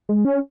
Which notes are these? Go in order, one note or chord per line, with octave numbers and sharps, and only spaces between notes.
G#3
C#4